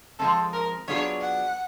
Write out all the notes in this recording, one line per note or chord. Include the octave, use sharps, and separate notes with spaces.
F3 G#3 C4 A4
A#4
F#3 B3 D4 F4 G#4 C#5
F#5